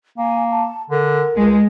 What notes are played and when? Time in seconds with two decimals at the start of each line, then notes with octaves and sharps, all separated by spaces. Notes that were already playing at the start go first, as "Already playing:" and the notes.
0.18 A#3 G#5
0.51 A5
0.90 D3 A#4
1.36 C#2 G#3